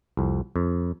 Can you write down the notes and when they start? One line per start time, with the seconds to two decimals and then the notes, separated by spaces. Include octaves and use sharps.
0.17 C2 F2
0.56 F2